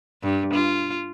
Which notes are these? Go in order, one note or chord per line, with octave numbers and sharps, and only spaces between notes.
G2
F4